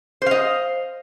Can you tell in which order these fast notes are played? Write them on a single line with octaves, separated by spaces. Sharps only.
C5 F5 D#5